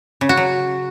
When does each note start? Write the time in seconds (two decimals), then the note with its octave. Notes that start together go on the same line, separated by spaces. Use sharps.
0.21 C#3
0.29 F#4
0.37 F#3